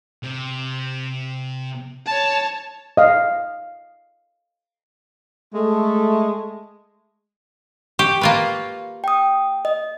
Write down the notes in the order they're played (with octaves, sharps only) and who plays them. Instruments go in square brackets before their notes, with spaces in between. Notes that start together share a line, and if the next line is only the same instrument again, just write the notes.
[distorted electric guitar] C3
[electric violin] C#5 A5
[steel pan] D#5 F5
[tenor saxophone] G#3 [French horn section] A3
[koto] G4 [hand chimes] C#6
[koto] A#3 F4 B4
[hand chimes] G5 D#6
D#5